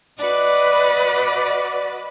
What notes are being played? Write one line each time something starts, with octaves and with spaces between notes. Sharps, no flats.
F#4 B4 D5 D#5